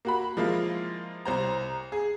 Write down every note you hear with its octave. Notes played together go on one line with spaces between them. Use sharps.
A#3 F#4 B5
F3 G#3 A#3 E4 F4
C2 C5 A#5
G#4